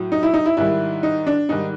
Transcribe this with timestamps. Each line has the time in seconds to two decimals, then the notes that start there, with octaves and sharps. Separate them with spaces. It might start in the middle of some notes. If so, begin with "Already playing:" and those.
Already playing: A2 F#3
0.12 D#4
0.23 E4
0.34 D#4
0.46 E4
0.57 G#2 D#3 G3 E4
1.03 D#4
1.27 D4
1.49 G#2 D#3 G3 D#4